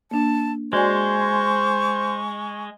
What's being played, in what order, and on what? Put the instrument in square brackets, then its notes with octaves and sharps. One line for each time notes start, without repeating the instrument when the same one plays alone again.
[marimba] A#3 D4 [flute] A5
[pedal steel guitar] G#3 [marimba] F#4 D5 G#5 [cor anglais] C5 [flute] C#6